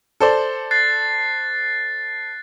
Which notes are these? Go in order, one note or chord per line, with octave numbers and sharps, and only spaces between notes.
A4 C5 D5
F#6 A6 C7